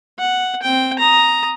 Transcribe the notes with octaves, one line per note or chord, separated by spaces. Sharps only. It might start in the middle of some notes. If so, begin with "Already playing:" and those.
F#5
C4 G5
A#5 D#6